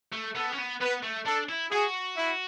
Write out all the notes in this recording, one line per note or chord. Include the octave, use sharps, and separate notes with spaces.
A3
B3 A4
C#4
B3
B3 B4
A3
D4 A4
E4
F#4 G#4
E4